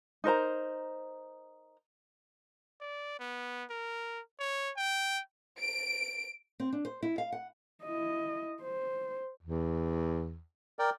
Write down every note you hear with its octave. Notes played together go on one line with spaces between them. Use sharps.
D#4 A#4 C5 A#5
D5
B3
A#4
C#5
G5
D7
C4
D4
C5
E4
F5
F#5
E4 D#5
C5
E2
A#4 D5 G5